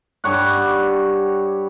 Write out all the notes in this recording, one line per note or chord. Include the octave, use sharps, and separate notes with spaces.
G2 G3 C#5 F#5